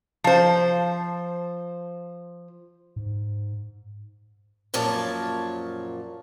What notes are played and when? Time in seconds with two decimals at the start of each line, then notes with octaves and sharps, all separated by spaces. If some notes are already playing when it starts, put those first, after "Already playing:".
0.24 F3 C5
2.96 G#2
4.74 F#2 A#2 F3 C#5 A5